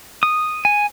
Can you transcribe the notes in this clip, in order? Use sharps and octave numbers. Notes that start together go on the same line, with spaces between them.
D#6
G#5